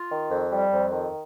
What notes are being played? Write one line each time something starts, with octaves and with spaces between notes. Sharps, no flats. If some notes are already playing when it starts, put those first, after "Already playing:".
Already playing: F4
D#3
F2
G3
F2
D#3